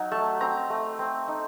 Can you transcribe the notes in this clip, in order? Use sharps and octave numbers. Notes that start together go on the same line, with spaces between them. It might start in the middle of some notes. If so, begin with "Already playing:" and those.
Already playing: F#3 D#4 F#5
A3 A5
C4 A#5
A3
C4
D#4